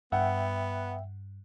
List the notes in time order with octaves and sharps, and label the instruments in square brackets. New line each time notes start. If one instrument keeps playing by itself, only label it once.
[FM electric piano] G2 [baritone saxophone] B3 [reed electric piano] E5 G5 [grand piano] F#5